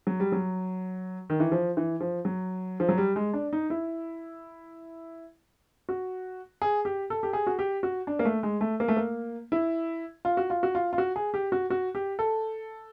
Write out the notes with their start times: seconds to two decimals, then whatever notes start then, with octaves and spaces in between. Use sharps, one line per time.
0.07 F#3
0.20 G3
0.32 F#3
1.30 D#3
1.40 E3
1.52 F3
1.77 E3
2.01 F3
2.25 F#3
2.80 F3
2.89 F#3
2.98 G3
3.16 G#3
3.33 D4
3.53 D#4
3.70 E4
5.89 F#4
6.62 G#4
6.85 G4
7.10 A4
7.23 G4
7.33 G#4
7.47 F#4
7.59 G4
7.83 F#4
8.07 D4
8.19 A#3
8.25 A3
8.43 G#3
8.61 A3
8.80 A#3
8.88 A3
8.97 A#3
9.52 E4
10.25 F4
10.37 F#4
10.50 F4
10.63 F#4
10.75 F4
10.93 F4
10.98 F#4
11.16 G#4
11.34 G4
11.52 F#4
11.70 F#4
11.95 G4
12.19 A4